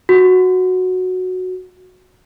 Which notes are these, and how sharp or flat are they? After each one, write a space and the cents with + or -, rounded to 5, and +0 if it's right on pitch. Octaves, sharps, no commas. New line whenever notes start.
F#4 -5